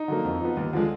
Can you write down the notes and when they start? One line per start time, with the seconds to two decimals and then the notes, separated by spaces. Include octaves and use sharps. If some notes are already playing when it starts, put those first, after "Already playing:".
Already playing: D#4
0.08 D3 F#3 A#3
0.24 F2
0.41 F3 B3
0.57 D#2
0.73 D3 F3 G#3